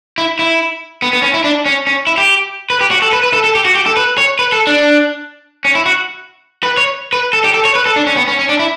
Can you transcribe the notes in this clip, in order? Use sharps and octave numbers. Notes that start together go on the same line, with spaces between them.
E4
E4
B3
B3
C#4
E4
D4
C#4
C#4
E4
G4
B4
G4
F#4
A4
B4
B4
A4
A4
G4
F#4
G4
A4
B4
C#5
B4
A4
D4
C#4
E4
F#4
B4
C#5
B4
A4
G4
A4
C#5
B4
A4
D4
C#4
B3
C#4
C#4
D4
E4